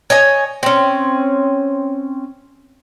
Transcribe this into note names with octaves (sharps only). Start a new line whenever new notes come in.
C#5 D#5 G#5
C4 C#4